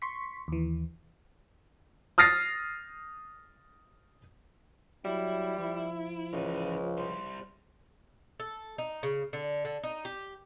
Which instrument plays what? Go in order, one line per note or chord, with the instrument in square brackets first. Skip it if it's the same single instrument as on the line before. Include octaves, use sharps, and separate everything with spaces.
[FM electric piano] C6 C#6 B6
D#2 E3
[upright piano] D#6 F6 A6 A#6 C7
[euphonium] F#3 [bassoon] G3 [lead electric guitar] E4
[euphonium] F3
[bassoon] C#2 [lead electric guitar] E3 C#4
[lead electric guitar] G3 C5
[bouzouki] A4
D#4
C#3
D3
D3
D#4
G4